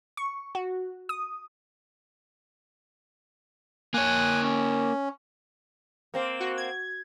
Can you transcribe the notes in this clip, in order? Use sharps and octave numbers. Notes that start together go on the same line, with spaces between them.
C#6
F#4
D#6
A#3 C#5 G#5 F#6
C#4
A#3 C4
F#4
G#6